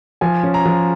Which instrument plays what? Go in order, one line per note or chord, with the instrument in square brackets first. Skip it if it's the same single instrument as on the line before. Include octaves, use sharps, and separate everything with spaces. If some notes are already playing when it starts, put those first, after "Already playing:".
[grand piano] F3 G#5
C#4
A#5
F3